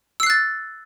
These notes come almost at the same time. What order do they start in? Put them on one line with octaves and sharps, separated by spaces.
E6 C7 F#6 A6